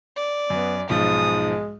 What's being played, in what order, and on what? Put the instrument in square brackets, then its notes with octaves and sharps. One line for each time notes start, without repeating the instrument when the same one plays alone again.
[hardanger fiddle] D5
[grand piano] F#2 [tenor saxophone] B3
[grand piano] B1 G#2 F3 [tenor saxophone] G#3 [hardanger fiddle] D#6